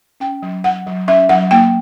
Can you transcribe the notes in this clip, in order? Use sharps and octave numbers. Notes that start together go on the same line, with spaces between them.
C#4 G5
F#3
F#3 F#5
F#3
C#4 E5
F#3 F#5
A#3 G5